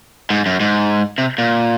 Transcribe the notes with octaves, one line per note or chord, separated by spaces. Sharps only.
G#2
F#2
G#2
C3
A#2